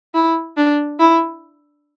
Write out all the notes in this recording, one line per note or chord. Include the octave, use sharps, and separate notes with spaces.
E4
D4
E4